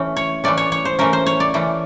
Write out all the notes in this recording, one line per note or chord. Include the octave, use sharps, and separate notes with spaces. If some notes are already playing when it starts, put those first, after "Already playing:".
Already playing: E3 A3 C#4
C#5
E3 A3 C#4 D5
C#5
C#5
C5
E3 A3 C#4 A#4
C5
C#5
D5
E3 A3 C#4